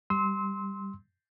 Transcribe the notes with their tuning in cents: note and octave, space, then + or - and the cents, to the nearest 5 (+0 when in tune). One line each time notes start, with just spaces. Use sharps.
G3 +0 C6 +0 E6 -35